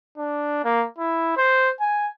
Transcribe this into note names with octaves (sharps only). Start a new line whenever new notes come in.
D4
A#3
E4
C5
G#5